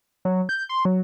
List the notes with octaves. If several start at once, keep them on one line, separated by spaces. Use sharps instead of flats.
F#3
G6
C6
F#3